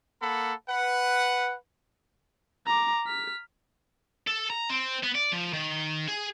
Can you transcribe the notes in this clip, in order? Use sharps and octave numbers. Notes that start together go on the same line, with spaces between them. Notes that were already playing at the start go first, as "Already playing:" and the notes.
A#3 A4 F#5 B5
B4 F#5
A#5 D6
F6 B6
A4
A#5
C4
B3
D5
F3
D#3
G#4